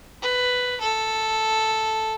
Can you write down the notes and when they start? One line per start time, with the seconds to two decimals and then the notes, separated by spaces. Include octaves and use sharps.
0.22 B4
0.80 A4